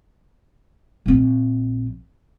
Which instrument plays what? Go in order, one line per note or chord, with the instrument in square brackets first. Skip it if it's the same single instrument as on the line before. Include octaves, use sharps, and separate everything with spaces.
[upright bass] A#1 C4